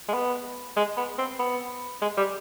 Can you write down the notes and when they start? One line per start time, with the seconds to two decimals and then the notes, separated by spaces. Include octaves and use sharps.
0.09 G#3
0.14 B3
0.77 G#3
0.97 B3
1.18 C4
1.39 B3
2.02 G#3
2.18 G3